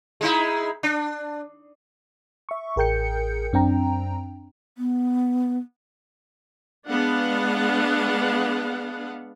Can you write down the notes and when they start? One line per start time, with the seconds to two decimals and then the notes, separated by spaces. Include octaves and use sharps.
0.21 G#3 D#4 E4
0.83 D4
2.49 E5 C#6
2.76 A1 G#4 A#4 G5 G6 C#7
3.53 F#2 C4 D4 G5 A#5
4.78 B3
6.87 G#3 B3 D4 F5 F#5